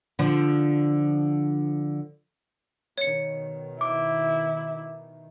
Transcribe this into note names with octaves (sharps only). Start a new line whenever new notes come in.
D3 F3
B2 D#3 C#5 C#7
E4 D6